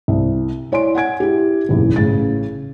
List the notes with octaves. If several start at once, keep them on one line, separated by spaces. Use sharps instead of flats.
C2
E4 C#5 D5 G#5 C6 D7
F#5 G#5 G#6 D7
E4 G4
F#1 B1 E2
A1 C#3 A6